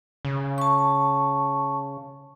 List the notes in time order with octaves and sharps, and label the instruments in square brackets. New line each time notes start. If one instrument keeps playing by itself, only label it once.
[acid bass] C#3
[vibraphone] A5 C#6